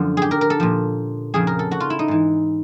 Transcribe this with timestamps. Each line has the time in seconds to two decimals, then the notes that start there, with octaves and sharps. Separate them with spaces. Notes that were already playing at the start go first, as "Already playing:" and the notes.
Already playing: F#2 D3 F3
0.17 G4 G#4
0.31 A#4
0.41 A#4
0.50 A4
0.60 A#2 F3
1.34 F2 C#3 F3 G#4
1.47 A#4
1.59 A4
1.71 F#4
1.80 F4
1.90 E4
1.99 D#4
2.08 G#2 E3